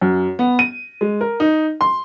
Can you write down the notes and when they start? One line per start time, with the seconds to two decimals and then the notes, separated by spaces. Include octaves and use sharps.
0.01 F#2
0.39 B3
0.59 D#7
1.01 G#3
1.21 A#4
1.40 D#4
1.81 C6